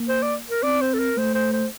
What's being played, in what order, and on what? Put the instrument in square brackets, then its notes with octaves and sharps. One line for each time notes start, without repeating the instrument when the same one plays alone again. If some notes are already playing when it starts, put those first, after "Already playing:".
Already playing: [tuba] A#3
[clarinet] C5
D5
A#4
[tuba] C4 [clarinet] D5
[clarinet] C5
A4
A#4
[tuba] A3 [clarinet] C5
[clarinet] C5
C5